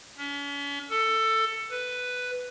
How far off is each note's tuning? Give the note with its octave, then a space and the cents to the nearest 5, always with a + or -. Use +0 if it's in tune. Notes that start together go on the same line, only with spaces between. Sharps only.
C#4 +40
A4 +15
B4 +5